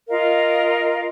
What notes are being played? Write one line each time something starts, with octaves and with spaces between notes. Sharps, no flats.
F4 A#4 D#5 F5